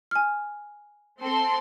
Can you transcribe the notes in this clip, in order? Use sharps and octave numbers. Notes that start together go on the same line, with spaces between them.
G#5 F6
C4 A4 C6